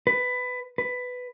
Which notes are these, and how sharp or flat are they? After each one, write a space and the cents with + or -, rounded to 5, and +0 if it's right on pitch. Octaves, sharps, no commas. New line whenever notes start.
B4 +15
B4 +10